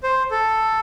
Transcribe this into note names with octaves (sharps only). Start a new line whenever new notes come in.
C5
A4